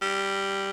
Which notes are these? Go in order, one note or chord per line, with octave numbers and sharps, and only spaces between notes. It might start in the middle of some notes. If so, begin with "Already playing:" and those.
G3